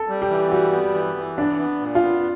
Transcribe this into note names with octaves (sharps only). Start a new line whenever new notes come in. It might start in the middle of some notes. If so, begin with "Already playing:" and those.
Already playing: A4
G3
G4
E3
G3 F#4
B3
E3
E3
B3 D4
B3
A#2
F4
B3